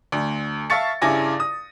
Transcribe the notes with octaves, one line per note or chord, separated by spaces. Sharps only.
D2
E5 F5 A5 C#6 A6 C#7
G2 C#3 E4 G#5 D6 A#6
D#6